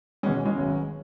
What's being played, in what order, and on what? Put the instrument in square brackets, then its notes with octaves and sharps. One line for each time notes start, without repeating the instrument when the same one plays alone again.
[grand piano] E1 E2 B2 B3 [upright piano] G#3 C#4
[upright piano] G#3 C#4
[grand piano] G#1 F#2 F#3 B3